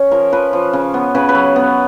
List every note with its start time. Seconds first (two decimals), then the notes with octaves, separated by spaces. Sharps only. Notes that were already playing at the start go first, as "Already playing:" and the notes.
Already playing: C#4 C#5
0.11 F3 A#4
0.32 F3 B4
0.53 F3
0.73 C#3
0.94 B3
1.15 C#3 B4
1.29 B4
1.35 F#3
1.56 B3